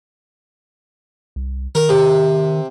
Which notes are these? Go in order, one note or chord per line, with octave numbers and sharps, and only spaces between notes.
C2
D#3 A#4
C3